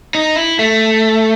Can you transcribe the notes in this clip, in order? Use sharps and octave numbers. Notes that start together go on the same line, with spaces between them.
D#4
E4
A3